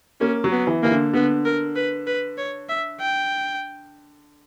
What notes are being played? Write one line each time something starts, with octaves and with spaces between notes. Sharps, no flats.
A#3 C#4
F#3
B3
E3
E3 A#3
D3
D3 B3
A#4
B4
B4
C#5
E5
G5